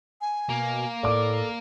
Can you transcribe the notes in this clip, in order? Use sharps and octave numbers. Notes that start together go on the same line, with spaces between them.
G#5
B2 A#3
A2 A4 D5 D6